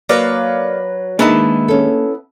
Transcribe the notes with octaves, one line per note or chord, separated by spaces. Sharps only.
F#3 A#3 B4 D5 F5 A#5
D#3 G#3 A#3 B3 D4 E4 A5 A#5
C#4 A4